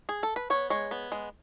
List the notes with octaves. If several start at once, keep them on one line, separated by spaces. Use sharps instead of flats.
G#4
A4
B4
B3 C#5
G#3 C#5
B3
G#3